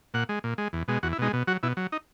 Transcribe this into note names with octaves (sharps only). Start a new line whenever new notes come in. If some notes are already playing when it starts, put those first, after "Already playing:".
A#2 F#5
G#3
A#2
G#3
E2
B2 G#3
E2 F#4
E4
B2 G#3 D#4
B2
F#3 F#4
B2 E4
F#3
D#4